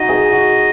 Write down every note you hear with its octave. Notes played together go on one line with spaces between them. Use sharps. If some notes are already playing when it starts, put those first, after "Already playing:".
Already playing: D#4 F#4 D#5
G#4
F#4